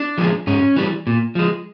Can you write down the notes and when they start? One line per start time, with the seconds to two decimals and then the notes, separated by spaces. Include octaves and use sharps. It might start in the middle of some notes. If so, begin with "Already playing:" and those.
Already playing: D4
0.18 F3 G#3
0.47 G#2 C#4
0.76 E3 G3
1.07 A#2
1.35 F3 G#3